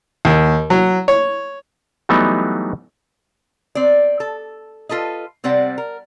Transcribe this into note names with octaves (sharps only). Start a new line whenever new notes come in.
D#2
F#3
C#5
E3 F#3 G3 A3 B3 D#4
C4 D5
A4
F4 A4 B4 D#5
C3 G3 C4 D5 F#5
A#4